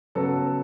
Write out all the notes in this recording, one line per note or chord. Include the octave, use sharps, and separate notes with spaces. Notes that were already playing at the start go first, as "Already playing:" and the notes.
C#3 F#3 B3 A4